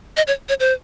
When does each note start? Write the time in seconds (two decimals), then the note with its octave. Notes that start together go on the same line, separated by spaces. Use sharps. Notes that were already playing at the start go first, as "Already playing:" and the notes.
0.17 D#5
0.27 C#5
0.49 C#5
0.60 C5